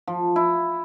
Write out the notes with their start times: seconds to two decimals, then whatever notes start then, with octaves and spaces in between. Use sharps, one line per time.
0.07 F3
0.36 E4